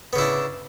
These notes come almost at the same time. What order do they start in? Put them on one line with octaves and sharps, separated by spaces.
B3 C#3 E4 D4